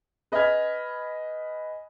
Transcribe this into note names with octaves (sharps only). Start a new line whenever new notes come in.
B4 D#5 G#5 B5 F6 G#6